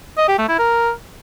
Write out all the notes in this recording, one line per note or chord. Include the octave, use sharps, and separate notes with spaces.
D#5
G4
A3
E4
A#4